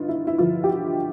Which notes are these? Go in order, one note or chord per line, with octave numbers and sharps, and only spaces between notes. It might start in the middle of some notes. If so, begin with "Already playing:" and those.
Already playing: G2 D3 D#4 F4
E4
E4
G2 D3 F3 F4
G4
F#4